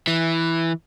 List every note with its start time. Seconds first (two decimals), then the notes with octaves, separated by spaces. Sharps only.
0.07 E3